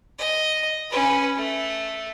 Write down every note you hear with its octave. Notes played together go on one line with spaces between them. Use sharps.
D#5
C#4 B4
A3